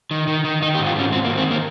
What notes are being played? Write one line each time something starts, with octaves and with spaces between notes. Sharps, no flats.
D#3
D#3
D#3
D#3 D#4
G4
G#2
F4
G#2 C#4
G#2 C4
A#3
D#3
C4
A#3